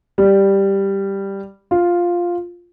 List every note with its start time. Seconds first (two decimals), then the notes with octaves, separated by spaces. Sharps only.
0.18 G3
1.71 F4